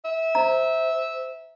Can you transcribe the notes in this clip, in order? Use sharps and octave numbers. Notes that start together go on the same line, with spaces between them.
E5
C5 A#5